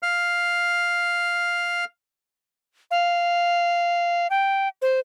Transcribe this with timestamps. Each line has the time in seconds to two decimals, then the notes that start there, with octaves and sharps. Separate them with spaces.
0.03 F5 F6
2.91 F5
4.30 G5
4.82 C5